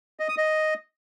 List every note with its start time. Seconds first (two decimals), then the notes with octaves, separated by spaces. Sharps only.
0.20 D#5
0.29 D#6
0.38 D#5